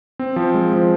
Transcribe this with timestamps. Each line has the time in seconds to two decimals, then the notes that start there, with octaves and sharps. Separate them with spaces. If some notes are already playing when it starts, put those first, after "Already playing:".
0.19 C4
0.36 F3
0.54 G#3
0.73 F3